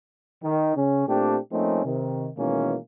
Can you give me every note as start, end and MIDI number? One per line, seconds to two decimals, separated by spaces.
0.43 0.72 51
0.76 1.07 49
0.76 1.07 61
1.08 1.38 46
1.08 1.38 57
1.08 1.38 60
1.08 1.38 62
1.08 1.38 67
1.52 1.85 53
1.52 1.85 57
1.52 1.85 58
1.52 1.85 60
1.52 1.85 61
1.52 1.85 63
1.85 2.29 48
1.85 2.29 51
2.37 2.77 47
2.37 2.77 51
2.37 2.77 52
2.37 2.77 56
2.37 2.77 58
2.37 2.77 61